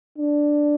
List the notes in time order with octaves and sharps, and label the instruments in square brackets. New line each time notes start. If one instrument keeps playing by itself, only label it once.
[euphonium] D4